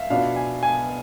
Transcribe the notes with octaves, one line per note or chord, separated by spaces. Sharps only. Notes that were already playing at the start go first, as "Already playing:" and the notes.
Already playing: E5 F5
B2 B3 D4 F4 F5
G#5
G#5